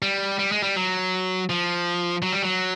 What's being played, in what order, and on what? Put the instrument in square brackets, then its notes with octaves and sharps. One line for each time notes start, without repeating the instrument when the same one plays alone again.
[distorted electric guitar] G3
G3
G#3
G3
F#3
F3
F#3
G3
F#3